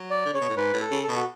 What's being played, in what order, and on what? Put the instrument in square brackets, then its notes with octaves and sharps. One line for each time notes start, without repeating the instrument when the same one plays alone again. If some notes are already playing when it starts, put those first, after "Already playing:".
Already playing: [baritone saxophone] F#3
[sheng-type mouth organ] D5
[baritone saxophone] D3
[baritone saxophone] C#3 [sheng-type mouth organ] C#5
[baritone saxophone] B2
A2
[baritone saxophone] G#2 [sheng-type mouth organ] B4
[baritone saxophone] A2
[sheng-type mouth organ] A4
[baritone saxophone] C#3
[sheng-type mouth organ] A4
[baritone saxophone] B2
[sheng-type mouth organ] F#4